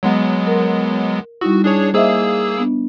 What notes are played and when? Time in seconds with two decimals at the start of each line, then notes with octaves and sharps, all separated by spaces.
0.03 F#3 G#3 B3
0.47 A#4
1.41 G3 D#4 E4 F#4
1.64 D4 G#4 C#5
1.94 A#3 G#4 C5 D#5 E5 E6
2.58 B3 D4